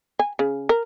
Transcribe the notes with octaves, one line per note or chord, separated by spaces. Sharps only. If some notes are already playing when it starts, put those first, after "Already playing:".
G#5
C#3
A#4